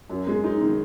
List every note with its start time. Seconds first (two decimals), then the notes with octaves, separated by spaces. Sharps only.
0.10 F#2
0.27 G#3
0.44 D#4
0.61 D#3